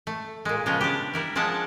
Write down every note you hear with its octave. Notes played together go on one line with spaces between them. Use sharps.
A3
A#2 G#3
C#3 F3 G#3 B3 G5
D4 G4
G3 E4 A#4
F3 G#3 D4 F#5 A5